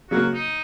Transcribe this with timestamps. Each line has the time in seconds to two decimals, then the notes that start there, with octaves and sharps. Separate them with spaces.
0.10 C#3 F#3 A#3 F#4
0.33 D#4